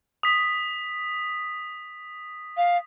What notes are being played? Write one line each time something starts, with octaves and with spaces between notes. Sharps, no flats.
D#6 B6
F5